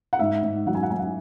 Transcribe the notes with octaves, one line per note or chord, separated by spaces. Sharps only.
F#5
G#2 E5
G#2
F#3 F#5
G#5
F#5
F#3 G#5
F#5